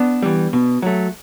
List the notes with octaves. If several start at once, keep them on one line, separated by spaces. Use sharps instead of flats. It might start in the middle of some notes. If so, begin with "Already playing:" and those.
Already playing: B3 D4
E3 G3
B2
F#3 A3